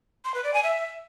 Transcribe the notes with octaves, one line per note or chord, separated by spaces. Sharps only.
C6
B4
D5
G#5
E5